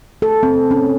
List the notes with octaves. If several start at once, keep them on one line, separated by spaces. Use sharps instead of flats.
A4
C4
C#4